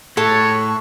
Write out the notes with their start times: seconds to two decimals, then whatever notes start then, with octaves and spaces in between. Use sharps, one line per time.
0.17 A2 A4 C#5 A5 C#6 E6 F#6